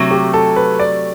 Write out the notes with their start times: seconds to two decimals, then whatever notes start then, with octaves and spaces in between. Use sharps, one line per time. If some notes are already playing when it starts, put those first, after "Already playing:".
Already playing: C3 F#3 A3
0.11 G4
0.34 A4
0.56 B4
0.79 D5